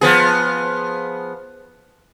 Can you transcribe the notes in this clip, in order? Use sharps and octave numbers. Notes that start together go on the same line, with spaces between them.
F3 B3 G#4